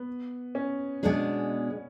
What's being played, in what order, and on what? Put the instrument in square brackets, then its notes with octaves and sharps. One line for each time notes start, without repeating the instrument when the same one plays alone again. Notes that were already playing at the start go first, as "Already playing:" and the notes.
Already playing: [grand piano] B3
C#4
[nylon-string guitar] B2 G#3 B3 D4 G#4